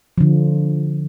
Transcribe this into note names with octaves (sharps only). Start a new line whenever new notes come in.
D3 F3